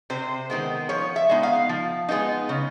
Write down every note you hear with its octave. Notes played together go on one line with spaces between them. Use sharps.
C3 C5
D#3 G#3 B3
F3 C#5
E5
G#3 B3 D#4
F5
F3
G#3 B3 D#4
C#3